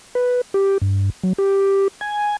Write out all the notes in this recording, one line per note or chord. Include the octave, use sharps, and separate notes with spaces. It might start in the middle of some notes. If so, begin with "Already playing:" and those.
B4
G4
G2
F#3
G4
G#5